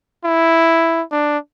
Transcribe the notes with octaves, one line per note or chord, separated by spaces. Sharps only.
E4
D4